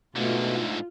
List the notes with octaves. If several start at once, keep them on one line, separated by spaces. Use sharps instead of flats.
G#2 B2 D3 A3 F4